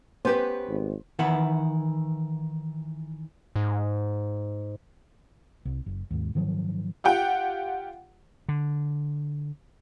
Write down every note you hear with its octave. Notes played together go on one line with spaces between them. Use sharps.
B3 C#4 G4 B4 C5
G#1
D#3 E3 E4 B4 F#5
G#2
C2
F#1
D#2 G#2
G#2 D#3 F3 F#3
F4 G4 F#5 G5
D3